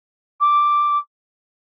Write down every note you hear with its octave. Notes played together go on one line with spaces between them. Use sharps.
D6